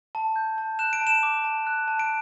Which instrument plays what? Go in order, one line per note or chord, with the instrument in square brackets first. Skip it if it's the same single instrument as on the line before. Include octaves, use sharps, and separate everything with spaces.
[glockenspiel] A5
G6
A5
F#6 E7
D7
A5
E7
D6
A5
F#6
A5
D7